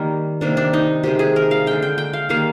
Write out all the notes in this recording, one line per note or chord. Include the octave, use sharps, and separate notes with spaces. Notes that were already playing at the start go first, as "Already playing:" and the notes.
Already playing: D#3 G3 A#3
C3 D#3 A#3 D4
D4
D#4
C3 D#3 G#3 G4
G#4
A#4
F5
D3 G#3 G5
G5
G5
F5
D#3 G3 A#3 F5